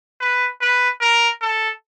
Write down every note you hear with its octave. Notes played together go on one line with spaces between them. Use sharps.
B4
B4
A#4
A4